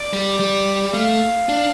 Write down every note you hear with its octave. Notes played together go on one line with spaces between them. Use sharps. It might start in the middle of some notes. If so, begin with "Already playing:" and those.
Already playing: D5
G3
G3
A3 F5
D4